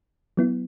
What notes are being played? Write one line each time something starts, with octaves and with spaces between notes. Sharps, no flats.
F#3 B3 E4